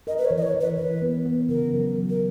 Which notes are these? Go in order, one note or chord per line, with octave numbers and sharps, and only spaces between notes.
A#4 D#5
B4
C#5
E3
D#5
C#5
E3
B4
E3 B4
B3
B3
C#3 A#4
F#3
F#3
A#4